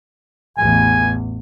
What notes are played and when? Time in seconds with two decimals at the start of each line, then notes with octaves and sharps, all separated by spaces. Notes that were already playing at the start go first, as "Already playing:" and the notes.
0.58 A1 E2 G#5